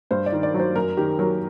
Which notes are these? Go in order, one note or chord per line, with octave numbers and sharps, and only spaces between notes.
G2 C5
D5
D#3
D5
F#3
C5
F#2 A#4
D#3 G4
F#3 A#4